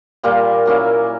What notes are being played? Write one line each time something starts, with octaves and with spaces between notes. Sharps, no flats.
A#2 G3 A#3 F4
F#3 A#3 C#4 E4